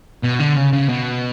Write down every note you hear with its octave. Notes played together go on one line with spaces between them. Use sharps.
B2
D3
C#3
C#3
B2